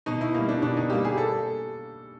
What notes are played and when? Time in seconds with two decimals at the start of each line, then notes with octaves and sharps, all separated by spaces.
0.06 B2 D#4
0.21 E4
0.34 G3 A#3 D#4
0.49 D4
0.62 B2 D4
0.77 D#4
0.90 G3 A#3 G4
1.05 G#4
1.18 A4